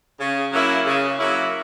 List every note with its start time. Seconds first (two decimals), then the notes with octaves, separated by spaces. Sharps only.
0.19 C#3
0.52 F#3 A#3 C#4 E4
0.86 C#3
1.18 F#3 A#3 C#4 E4